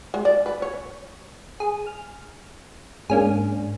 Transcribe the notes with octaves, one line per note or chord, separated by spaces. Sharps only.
G#3
D5
B4
C#5
G#4
F6
G#2 A#3 C#4 D4 G#4